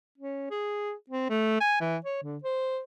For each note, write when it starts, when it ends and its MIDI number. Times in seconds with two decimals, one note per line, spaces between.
0.18 0.47 61
0.51 0.93 68
1.10 1.28 60
1.30 1.60 57
1.61 1.77 80
1.81 1.97 52
2.05 2.19 73
2.23 2.38 50
2.44 2.80 72